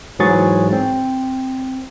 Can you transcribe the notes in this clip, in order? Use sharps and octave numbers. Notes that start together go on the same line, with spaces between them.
G#2 E3 F#3 G#4 C#6 A6
C4